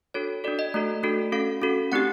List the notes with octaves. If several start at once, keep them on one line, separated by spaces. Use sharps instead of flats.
D4 F#4 A4 C#5
D4 F#4 A4 D5
D#5
A3 D4 F#4 A4
A3 D4 F#4 A4
C#4 F#4 A4 F5
C#4 F#4 A4
A3 C4 D#4 G4 F#5